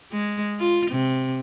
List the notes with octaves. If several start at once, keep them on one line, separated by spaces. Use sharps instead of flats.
G#3
F4
C3